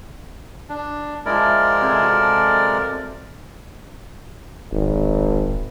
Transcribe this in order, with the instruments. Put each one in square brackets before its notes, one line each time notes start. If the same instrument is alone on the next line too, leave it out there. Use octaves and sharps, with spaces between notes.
[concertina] D4
[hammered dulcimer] F3 E4 [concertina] G#3 A#4 D5
[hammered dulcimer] C3 G#4 A4
F#4 A5
[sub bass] D1 [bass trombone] G#1